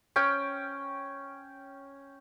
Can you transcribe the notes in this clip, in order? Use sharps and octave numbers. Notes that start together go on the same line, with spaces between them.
C#4 G5